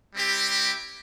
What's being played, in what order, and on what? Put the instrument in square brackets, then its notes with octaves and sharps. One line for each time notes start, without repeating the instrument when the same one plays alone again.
[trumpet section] G3 C4 E4 G4